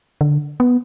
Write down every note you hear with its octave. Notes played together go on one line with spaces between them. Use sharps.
D3
B3